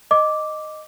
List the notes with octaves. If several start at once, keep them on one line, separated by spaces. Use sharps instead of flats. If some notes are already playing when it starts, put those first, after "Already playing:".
D#5 D6